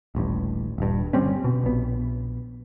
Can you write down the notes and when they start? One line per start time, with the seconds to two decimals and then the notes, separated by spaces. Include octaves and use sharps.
0.15 D#1 A1 G2
0.78 D#1 G2
1.13 G1 G3 C4 C#4
1.44 B2
1.64 A#1 B3